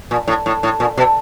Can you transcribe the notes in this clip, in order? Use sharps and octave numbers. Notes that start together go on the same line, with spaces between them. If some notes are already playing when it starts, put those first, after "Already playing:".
A#2
A2
A2
A2
A#2
B2